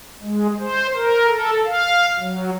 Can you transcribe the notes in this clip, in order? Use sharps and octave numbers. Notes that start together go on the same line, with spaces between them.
G#3
C5
A#4
A4
F5
F#3